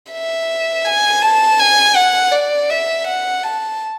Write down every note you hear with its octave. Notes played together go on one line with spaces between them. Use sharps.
E5
G#5
A5
G#5
F#5
D5
E5
F#5
A5